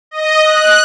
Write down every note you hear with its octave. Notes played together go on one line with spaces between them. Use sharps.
D#5
F#6